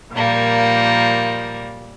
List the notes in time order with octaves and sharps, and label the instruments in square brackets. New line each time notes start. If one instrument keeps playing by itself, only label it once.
[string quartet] A#2 F3 G3 A#3